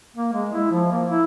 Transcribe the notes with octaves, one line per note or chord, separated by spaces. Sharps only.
A#3
G#3
E4
F3
A#3
E4